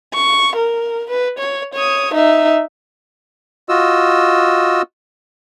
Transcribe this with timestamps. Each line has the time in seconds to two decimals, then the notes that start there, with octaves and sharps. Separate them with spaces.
0.14 C#6
0.56 A#4
1.10 B4
1.39 C#5
1.74 C#5 D#6
2.14 D#4 E5
3.69 F4 F#4 D#5 E6